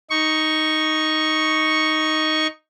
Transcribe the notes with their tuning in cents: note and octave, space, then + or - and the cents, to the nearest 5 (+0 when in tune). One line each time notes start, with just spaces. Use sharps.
D#4 +0 C#6 +0